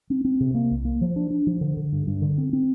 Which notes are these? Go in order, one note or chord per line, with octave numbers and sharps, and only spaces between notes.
C4
C4
C3
A#3
C2
A#3
F3
D4
D4
F3
D3
D3
G2
G2
D3
C4
C4